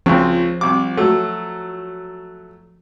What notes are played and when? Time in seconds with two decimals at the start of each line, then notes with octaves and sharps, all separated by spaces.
0.06 C#2 F3 C4
0.61 C2 D6
0.97 F#3 A3